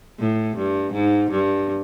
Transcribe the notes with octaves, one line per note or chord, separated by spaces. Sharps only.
A2
G2
G#2
G2